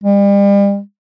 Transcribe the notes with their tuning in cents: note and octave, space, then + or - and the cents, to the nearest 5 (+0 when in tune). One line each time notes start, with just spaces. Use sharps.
G3 +35